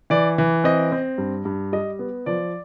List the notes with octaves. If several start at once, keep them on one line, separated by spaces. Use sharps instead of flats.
E3 D5
E3
C4 D#5
C4
G2
G2
G3 D#5
B3
F3 D5